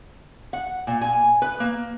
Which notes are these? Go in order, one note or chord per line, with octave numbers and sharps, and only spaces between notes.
F#5
A#2
G#5
B4
A#3